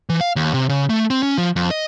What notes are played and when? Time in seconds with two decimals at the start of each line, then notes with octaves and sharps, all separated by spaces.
0.09 E3
0.21 F5
0.36 D#2
0.54 C3
0.69 C#3
0.90 A3
1.10 C4
1.23 C#4
1.38 F3
1.56 F2
1.71 D#5